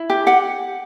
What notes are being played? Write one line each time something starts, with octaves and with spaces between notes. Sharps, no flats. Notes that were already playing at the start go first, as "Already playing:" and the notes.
Already playing: E4
G4
G4 F#5